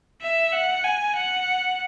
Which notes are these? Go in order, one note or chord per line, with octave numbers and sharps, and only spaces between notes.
E5
F#5
G#5
F#5